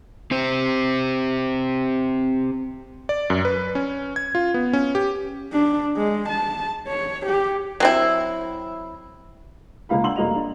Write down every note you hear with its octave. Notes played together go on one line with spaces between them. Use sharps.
C4 G4 C5
D5
F#2
B4
C#4
G#6
F4
B3
C#4
G4
D4
G#3
A5
C#5
G4
F#3 C4 E4
C#2 A#3 F5 B5
D4 F#5 C6 E6 F#7
F1 A#3 F#4 D#5 F7
D4